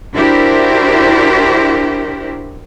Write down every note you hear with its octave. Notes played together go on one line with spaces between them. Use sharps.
D4 E4 F#4 G4 A#4 C5